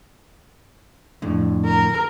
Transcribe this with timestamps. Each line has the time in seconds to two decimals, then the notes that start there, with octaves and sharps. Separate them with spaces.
1.22 F2 A2 D3
1.65 A#4